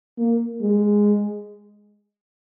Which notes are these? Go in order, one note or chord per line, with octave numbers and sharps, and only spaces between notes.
A#3
G#3